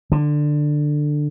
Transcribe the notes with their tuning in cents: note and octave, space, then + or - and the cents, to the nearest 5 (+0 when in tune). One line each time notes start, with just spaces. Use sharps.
D3 +15